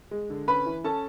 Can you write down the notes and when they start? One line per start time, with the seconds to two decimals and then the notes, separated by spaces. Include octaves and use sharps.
0.11 G#3
0.30 D3
0.48 C#4 B4 B5
0.66 E3
0.84 C#4 A4 A5